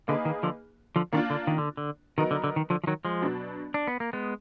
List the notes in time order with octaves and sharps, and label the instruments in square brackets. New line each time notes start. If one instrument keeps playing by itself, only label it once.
[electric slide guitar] D3 [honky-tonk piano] A#3 D#4 G#4 B4
[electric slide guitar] D#3
D3 F3
D3 F3
[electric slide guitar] D#3 [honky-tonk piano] A#3 D4 F4
[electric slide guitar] D3
D#3
D3
D3
[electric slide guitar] D#3 [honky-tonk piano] F#3 B3 D#4 A#4
[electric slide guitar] D3
D3
D#3
D3 F3
F3
D#3 F#3
F3 G#3
[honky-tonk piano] B2 F#3 D4
[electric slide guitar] D4
B3
A#3
G#3 B3